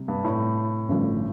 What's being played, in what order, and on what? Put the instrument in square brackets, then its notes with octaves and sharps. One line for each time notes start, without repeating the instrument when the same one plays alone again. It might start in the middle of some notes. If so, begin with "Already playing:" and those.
Already playing: [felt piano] C3 G3
[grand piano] G2
A2
[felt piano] A1 G2 D3 F3 A3